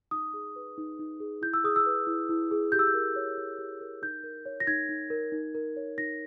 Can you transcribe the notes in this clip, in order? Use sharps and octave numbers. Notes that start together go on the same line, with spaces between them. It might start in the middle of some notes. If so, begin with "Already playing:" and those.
D#4 D#6
G#4
B4
D#4
D#4
G#4
E4 G6
E6
G#4 D#6
E6
B4
E4
E4
G#4
G4 G6
E6
G6
A#4
C#5
G4
G4
A#4
D#4 G6
A#4
C#5
A#6
D#4 G#6
D#4
A#4
D#4
A#4
C#5
D#4 A#6